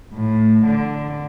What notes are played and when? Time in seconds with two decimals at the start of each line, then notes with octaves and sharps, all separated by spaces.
0.13 A2
0.66 D3